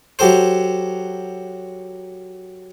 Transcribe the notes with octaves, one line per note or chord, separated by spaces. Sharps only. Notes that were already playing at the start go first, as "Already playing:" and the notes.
F#3 G4 A4 C5